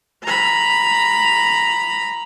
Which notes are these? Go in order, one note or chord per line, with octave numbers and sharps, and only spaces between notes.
A#5 B5